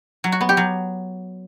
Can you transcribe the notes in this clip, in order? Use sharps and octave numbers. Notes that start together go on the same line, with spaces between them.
F#3
F#4
B3
G4
F#3